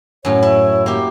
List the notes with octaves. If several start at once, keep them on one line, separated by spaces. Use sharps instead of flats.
F#2 A2 C#5
E4
A#3 G4